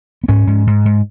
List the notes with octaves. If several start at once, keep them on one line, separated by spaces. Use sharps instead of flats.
B3
G#2 C#4
G#2
G#2
G#2